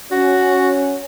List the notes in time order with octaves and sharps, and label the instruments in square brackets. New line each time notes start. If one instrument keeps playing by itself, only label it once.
[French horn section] C#4 C#5 [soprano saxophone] F#4